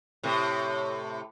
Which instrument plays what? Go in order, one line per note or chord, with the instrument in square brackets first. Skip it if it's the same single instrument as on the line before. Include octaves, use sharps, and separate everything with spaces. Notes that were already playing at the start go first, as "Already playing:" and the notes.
[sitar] A2 C3